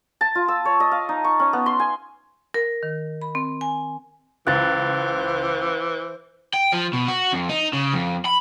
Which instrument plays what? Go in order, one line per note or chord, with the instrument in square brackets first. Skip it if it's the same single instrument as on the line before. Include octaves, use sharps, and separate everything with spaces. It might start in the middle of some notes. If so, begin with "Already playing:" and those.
[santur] A5
F4
E6
C#5
D#5
F5
D#4
C#6
C#4
B3
C6
G#5
[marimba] A#4
D#3
B5
C4
G#5
[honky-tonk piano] C#2 [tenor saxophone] E3 [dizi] C5 [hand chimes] F#6 A6
[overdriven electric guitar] G5
F3
B2
F#4
F2
D#4
C#3
F2
B5